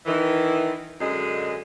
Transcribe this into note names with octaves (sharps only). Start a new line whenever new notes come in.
D#3 E3
F#2 D3 G#3 G#4 D#5